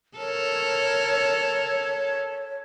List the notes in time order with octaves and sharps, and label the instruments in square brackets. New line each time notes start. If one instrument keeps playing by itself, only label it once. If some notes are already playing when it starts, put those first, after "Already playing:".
[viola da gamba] A4 A#4 [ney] C#5